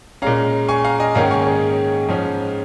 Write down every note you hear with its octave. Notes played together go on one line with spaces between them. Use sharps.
A#2 G#3 C#4 F5 A#5
G#5 C#6
F5 A#5
D#5 G#5
G#2 D#3 A#3 C#4 F5 A#5
G#5 C#6
G#4 C#5
G#2 F3 C#4